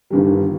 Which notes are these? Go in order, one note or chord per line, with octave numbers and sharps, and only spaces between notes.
G1 G2 D#3 G3